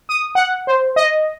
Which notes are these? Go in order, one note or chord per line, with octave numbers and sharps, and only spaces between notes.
D#6
F#5
C5
D#5